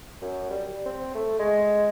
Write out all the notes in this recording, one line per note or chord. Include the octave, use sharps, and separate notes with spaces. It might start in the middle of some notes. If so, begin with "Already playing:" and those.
F#2
G3
C4
A3
G#3